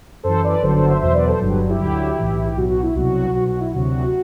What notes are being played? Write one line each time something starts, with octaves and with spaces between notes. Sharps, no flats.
F#2 E3 A4 C5
B4 D5
G1 G2 D3 F#3 A4 C5
A4 C5
C5 E5
E2 B2 F#3 C5 E5
B4 D5
A4 C5
G1 G2 F#3
G4 B4
E4 G4
D2 D3 F#3
B1 A2 E3
G4
B1 B2 F#3 F#4
F#4
E4
C2 B2 F#3 F#4
B1 B2 F#3 F#4
F#4
E4
D2 C3 F#3 F#4